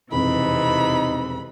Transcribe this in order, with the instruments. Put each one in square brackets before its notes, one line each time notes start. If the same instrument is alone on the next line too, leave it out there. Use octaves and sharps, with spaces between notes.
[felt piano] E1 F2 [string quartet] C3 E3 [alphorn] D#4 [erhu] B5